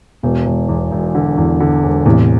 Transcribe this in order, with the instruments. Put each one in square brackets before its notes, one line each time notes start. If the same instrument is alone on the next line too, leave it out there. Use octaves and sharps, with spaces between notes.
[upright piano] E1 [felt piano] B2
[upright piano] E1
E2
E1
D3
E2
D3
E1
[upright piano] E2 [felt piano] A2 C3